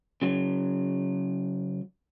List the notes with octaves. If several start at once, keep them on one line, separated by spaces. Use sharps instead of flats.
C#3 F#3